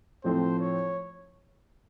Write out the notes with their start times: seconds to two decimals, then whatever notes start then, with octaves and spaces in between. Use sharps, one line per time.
0.24 A2 F3 A3 C4 C5
0.60 C#5